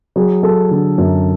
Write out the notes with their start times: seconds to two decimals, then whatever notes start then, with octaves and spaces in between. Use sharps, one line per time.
0.16 F#3 G#4
0.43 F#3 A4
0.71 D3
0.98 F#2